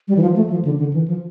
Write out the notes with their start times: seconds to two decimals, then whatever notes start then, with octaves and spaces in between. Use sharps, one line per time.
0.08 G3
0.17 E3
0.22 F3
0.36 A3
0.50 F3
0.65 D3
0.79 D3
0.93 E3
1.08 F3